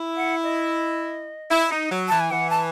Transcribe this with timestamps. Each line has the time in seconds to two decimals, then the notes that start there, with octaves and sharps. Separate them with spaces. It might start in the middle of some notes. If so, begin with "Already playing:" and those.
Already playing: E4
0.17 F#5
0.43 D#5
1.51 E4
1.71 D#4
1.91 F#3
2.09 E3 A5
2.20 G#5
2.31 E3 F#5
2.50 A5